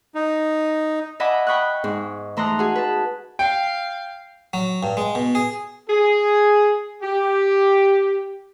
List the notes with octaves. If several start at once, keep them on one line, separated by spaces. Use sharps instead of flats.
D#4
D#5 E5 F#5 G#5 B5 D6
G5 B5 C#6 D#6 F#6
G#2
E3 A3 A#5 C6 D#6 F#6
F#4 G#4
B4 A5
F5 G5
F#3
G2
G#3
B2
G#4
G#4
G4